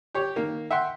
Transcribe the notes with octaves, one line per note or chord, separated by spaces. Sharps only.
G4 C#5
D#3 A#3
E5 F#5 G5 C6